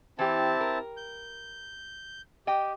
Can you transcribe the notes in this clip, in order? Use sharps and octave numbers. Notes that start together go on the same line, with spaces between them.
E3 C4 E4 G4 A5
A#4
G6
G4 D#5 G5